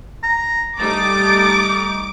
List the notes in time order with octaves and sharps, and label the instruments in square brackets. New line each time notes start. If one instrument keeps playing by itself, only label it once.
[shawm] A#5
[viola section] G3 A3 D#4 [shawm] A5 [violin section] D6